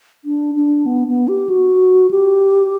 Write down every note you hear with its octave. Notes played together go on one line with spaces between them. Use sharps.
D4
D4
B3
B3
G4
F#4
G4